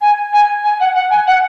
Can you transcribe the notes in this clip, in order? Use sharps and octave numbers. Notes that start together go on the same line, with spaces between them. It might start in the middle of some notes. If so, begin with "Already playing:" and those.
G#5
G#5
G#5
F#5
F#5
G#5
F#5